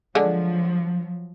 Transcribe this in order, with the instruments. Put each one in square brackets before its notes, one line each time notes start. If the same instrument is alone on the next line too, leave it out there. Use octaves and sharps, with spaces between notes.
[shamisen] D3 G#3 D4 [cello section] F3 F#3